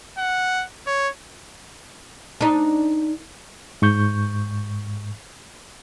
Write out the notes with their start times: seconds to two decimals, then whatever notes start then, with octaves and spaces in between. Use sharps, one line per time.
0.18 F#5
0.87 C#5
2.41 D4 D#4
3.82 G#2 C#6 G6